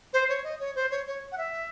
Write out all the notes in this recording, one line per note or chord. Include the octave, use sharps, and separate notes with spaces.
C5
C#5
D#5
C#5
C5
C#5
C#5
F#5
E5